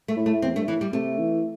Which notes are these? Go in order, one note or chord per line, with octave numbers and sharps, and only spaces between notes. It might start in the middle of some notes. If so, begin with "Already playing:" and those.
A3
A2
A3
E2 C4
G2 A3
A2 E3
G3
C3 A3
E3